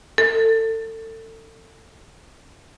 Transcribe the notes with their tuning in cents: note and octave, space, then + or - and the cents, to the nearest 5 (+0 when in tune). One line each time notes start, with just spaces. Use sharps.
A4 +30